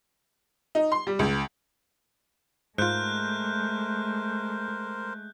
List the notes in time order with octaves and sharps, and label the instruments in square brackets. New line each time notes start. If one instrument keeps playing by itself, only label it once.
[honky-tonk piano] D#4
C6
G3
C#2
[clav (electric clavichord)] G#2 F4 [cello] G#3 A3 [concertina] A#4 C5 [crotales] F#6 G6